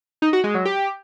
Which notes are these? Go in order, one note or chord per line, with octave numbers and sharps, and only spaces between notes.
D#4
F#4
G#3
F#3
G4